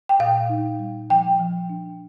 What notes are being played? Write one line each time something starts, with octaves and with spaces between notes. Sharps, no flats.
G5
A#2 F5
D#4
G3
F3 G5
F3
D4